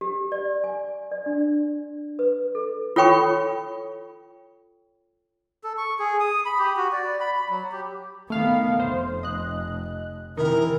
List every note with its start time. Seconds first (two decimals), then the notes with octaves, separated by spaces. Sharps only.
0.01 G4
0.32 D5
0.64 G#5
1.11 D5
1.26 D4
2.19 B4
2.55 A4
2.96 F4 A4 C#5 G5 B5 C#6
5.64 A4
5.78 C#6
5.99 G#4
6.20 D#6
6.45 B5
6.59 G4
6.77 F#4
6.93 D5
7.20 B5
7.35 B5
7.49 F#3
7.72 G4
8.30 D#3 A3 B3 F5
8.80 F1 C5
9.23 D#5 F#6
10.37 C3 D#3 E3 E4 A#4